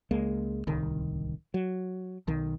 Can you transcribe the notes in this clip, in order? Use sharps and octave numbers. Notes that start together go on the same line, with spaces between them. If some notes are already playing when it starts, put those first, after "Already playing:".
C#2 G#3 A#3
D1 C2 D#3
F#3
B1 D#3